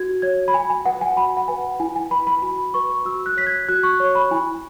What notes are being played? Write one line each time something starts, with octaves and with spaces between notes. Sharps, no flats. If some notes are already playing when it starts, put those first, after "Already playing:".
Already playing: F#4 G#6
C#5 G#6
B5
F#4 G#5
G#5
B4 F#5
G#5
F#4 B5
F#5
B4 G#5
E4 G#5
G#5
B4 B5
B5
F#4 B5
B4 C#6
F#4 E6
F#6
C#5 B6
G#6
F#4 F#6
C#6
C#5
B5
E4 G#5